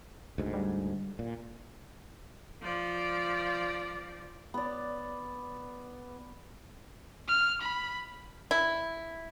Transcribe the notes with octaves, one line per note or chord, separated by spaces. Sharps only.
D2 G#2
G3
A#2
F3 D5
B3 D5
F6
B5
E4